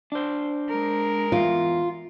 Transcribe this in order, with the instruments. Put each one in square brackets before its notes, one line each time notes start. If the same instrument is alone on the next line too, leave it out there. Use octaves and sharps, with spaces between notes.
[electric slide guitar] D4 C5
[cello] G#3 A#4
[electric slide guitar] E2 [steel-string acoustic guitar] F4